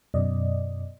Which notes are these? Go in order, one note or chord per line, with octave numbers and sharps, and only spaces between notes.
F#2 B2 D5 D#5